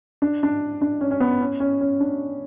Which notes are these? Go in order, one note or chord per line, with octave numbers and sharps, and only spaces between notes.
D4
D4
D4
C#4
C#4
B3
C#4
C#4
C#4
D4